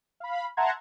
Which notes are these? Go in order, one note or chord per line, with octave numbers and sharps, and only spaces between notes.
F5 B5
E5 F#5 A5 A#5 C6 G#6